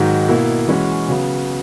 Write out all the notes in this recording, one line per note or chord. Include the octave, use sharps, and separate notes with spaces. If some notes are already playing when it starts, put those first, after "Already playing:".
Already playing: G#2 D#3 F#3
B2 A#3 E4
E3 G#3 C#4 F#4
C#3 F#3 B3